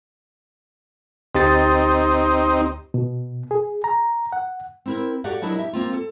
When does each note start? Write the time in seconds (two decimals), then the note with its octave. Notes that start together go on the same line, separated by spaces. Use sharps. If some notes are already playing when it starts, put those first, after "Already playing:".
1.35 D2 C4 D#4 G4 A6
2.94 B2
3.51 G#4
3.84 A#5
4.33 F#5
4.86 C4 E4 A#4
5.24 F#4 G4 A4 D5 F5 F#5
5.42 F#3 D4 E4 A#4 D#5
5.55 E4 G4 E5
5.73 A#3 C4 F4
5.93 A4